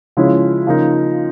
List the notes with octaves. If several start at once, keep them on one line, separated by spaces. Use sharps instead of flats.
C#3 F3 G#3 C#4 E4
C#3 F3 A#3 D#4